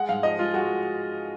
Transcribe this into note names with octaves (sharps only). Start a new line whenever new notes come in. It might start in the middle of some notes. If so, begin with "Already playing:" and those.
Already playing: G#3 F#5
G#2 F5
F3 D#5
G#3 F4
G#3 F#4